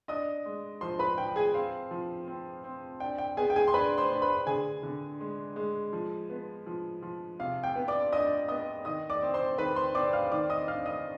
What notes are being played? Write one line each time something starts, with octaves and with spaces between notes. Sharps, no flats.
D4 D#5 D#6
G#3
F3 C5 C6
B4 B5
F3 G5
G#4 G#5
C4 F5
F3
C4
C4
D4 G5
G5
B3 G#4 G#5
G5
G#4 G#5
C6
D4 B4 B5
C5 C6
D4
B4 B5
D3 G#4 G#5
D3
G#3
G#3
F3
B3
F3
F3
C3 F5
G5
B3
D5 D6
D4 D#5 D#6
B3 D#5 D#6
D#3 D#5 D#6
D5 D6
C4
C5 C6
D#3 B4 B5
C5 C6
C4 D5 D6
F5 F6
D#3 D5 D6
D#5 D#6
D4 F5 F6
D#5 D#6